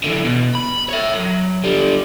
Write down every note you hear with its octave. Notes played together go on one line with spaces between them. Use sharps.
D3 E3
B2
B5
C#5 E5
F#3
D3 G3